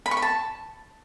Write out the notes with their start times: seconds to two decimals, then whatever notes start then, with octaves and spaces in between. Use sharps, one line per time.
0.06 B5
0.11 C#6
0.17 B5
0.22 A5